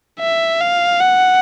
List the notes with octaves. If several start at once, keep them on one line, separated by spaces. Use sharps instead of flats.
E5
F5
F#5